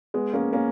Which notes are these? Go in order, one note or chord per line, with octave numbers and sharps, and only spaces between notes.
G#3 B3
A#3 C#4
A#3 C#4